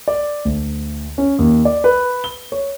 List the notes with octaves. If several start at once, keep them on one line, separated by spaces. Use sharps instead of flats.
D5
D2
C#4
D#2
D5
B4
G7
C#5